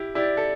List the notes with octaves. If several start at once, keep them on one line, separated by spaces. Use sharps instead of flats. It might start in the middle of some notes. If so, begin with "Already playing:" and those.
Already playing: E4 G4
E4 G4 D5
A4